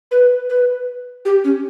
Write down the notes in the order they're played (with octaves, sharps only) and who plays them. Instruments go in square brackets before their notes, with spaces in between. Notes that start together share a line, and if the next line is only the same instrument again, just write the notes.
[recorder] B4
B4
G4
C#4